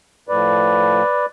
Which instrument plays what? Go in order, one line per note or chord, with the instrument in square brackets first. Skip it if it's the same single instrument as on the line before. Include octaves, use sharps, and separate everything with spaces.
[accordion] A2 F3 B4 D5